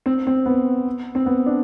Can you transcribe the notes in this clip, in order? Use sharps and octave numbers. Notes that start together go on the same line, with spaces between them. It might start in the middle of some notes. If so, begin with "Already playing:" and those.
C4
C4
B3
C4
B3
D4